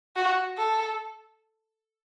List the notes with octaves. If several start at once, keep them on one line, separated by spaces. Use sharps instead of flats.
F#4
A4